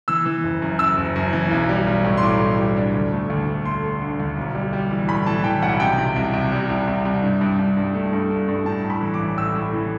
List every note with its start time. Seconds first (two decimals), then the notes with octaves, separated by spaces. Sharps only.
0.08 E3 E6
0.26 E3
0.43 F#1
0.62 F#2
0.79 F#1 E6
0.98 F#1
1.16 F#2
1.33 E3
1.51 B1
1.69 G3
1.87 B1
2.04 A2
2.17 C6
2.23 B1 D6
2.40 A2
2.58 G3
2.77 D4
2.94 D2
3.12 A3
3.30 D2
3.47 A3
3.65 A3 C6
3.83 A3
4.01 D3
4.20 D2
4.37 B1
4.55 G3
4.73 G3
4.91 E3
5.09 A2 B5
5.26 E3 A5
5.44 E3 G5
5.62 B1 F#5
5.80 C3 G5
5.98 C3
6.16 C2
6.33 C2
6.52 G3
6.70 C2
6.88 C2
7.05 C2
7.23 G2
7.41 G2
7.59 G2
7.77 G2
7.94 A3
8.13 G2
8.30 A3
8.48 G2
8.66 A2 A5
8.85 A2
8.90 B5
9.01 E3
9.14 D6
9.20 A1
9.37 A2 E6
9.56 A2
9.73 E3